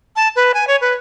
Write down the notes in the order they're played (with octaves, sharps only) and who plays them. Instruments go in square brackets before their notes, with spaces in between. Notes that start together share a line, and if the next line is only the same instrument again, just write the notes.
[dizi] A5
B4
G#5
C#5
B4